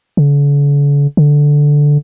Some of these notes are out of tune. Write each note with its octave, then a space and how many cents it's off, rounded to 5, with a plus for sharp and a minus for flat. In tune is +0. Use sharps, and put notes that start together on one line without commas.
D3 -45
D3 -5